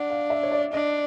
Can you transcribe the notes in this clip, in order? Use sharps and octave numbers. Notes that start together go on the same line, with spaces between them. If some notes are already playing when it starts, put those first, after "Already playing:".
Already playing: D4 F#5
F5
E5
C#5
D5
D4 D#5